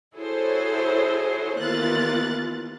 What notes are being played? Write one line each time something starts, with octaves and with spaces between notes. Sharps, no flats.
E4 F#4 G#4 A4 C5 C#5
D#2 E3 B3 F4 F#6 A6